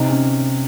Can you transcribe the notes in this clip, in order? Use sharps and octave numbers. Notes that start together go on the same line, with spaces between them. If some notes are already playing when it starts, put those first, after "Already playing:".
Already playing: C3 D#4
C#4